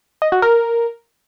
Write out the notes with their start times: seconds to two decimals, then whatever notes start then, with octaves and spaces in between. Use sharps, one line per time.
0.22 D#5
0.32 F#4
0.42 A#4